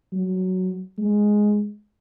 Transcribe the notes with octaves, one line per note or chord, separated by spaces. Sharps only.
F#3
G#3